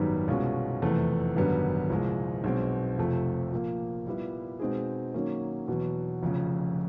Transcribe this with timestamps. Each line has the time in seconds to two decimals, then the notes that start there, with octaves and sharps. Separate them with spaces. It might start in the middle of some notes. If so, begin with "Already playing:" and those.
Already playing: G#1 F#2 D#3 G3 B3
0.28 C2 B2 G#3 C#4 F4
0.82 F1 E2 C3 E3 A3
1.36 G#1 F#2 D3 G3 B3
1.90 C2 A#2 F3 G#3
2.44 B1 B2 G#3 C4
2.98 F1 F2 C3 F3 A3
3.52 A#2 F3 A#3
4.07 A#2 G3 B3 E4
4.60 B2 G#3 C4 D#4 G#4
5.14 D#3 F#3 A#3 C#4
5.68 E2 B2 F#3
6.22 F1 F2 C#3